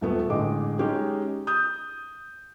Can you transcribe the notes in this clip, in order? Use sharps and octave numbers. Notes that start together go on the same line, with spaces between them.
D#1 A3 B3
A1 D3 G#3 D#5 D6
G#3 C#4 D#4 G4
D#6 G6